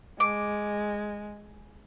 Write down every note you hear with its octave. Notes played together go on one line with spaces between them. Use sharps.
G#3 D6